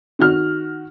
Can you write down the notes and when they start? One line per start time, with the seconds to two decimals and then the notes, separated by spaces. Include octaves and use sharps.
0.19 D#3 F#4 F6